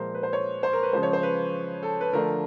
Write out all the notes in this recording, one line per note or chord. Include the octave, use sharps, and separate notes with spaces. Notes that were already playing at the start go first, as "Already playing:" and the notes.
Already playing: A#2 F3 G#3 A#4 C5
B4
C5
C#5
C5
A#4
B4
C#3 F3 G#3 C5
C#5
C5
B4
A4
B4
D3 F3 A3 D4 A#4